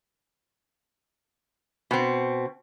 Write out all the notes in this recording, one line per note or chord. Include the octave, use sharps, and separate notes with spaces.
B2 C4